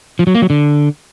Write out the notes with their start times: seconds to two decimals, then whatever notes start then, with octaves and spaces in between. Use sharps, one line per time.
0.19 F3
0.27 F#3
0.35 A#3
0.42 F#3
0.50 D3